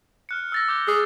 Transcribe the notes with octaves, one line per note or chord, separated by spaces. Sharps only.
F6 F#6 C#7
E6 A6 A#6
D6 G6 G7
G#4